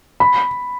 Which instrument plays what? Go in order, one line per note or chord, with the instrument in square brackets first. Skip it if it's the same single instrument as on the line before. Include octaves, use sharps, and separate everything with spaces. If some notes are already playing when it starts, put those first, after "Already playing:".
[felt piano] B5